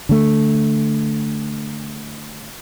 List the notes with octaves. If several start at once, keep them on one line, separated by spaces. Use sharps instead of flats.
D3 A3